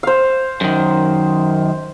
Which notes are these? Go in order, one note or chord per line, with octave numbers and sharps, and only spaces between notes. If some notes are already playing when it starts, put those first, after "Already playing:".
C5 F5
F#2 D#3